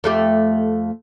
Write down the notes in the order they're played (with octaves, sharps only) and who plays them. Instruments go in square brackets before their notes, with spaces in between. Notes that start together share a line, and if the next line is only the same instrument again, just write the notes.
[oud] F2 A3 G4